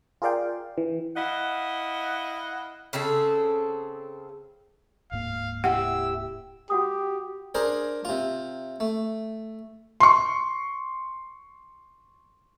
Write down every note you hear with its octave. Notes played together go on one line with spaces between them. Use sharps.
F4 G#4 A#4 D5 F5 G5
E3
E4 D#5 F5 F#5
C#3 C4 G#4 A4
D1 G#2 A#3 F5
C3 E4 G4 F#5 E6
F#4 G4 F#5 D#6
D4 G#4 A#4 C5
C3 F4
A3
C6 C#6